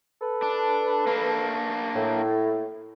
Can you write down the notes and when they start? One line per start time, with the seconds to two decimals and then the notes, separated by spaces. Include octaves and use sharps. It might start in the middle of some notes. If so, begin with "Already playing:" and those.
0.22 A4 B4
0.42 D4
1.07 A#3 D4
1.95 A2